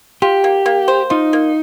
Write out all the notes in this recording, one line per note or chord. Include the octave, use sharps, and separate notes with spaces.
F4 G4
A#3
A#3
C5
D#4 F4
A#3